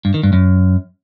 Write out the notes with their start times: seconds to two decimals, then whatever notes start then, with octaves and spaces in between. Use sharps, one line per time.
0.05 G2
0.14 D#3
0.23 G2
0.33 F#2